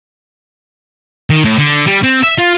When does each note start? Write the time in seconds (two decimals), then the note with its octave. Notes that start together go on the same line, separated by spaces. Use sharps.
1.30 D#3
1.45 A2
1.59 D3
1.87 G3
2.04 C4
2.24 E5
2.39 F4